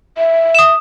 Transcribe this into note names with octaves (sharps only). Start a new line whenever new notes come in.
E5
D#6 E7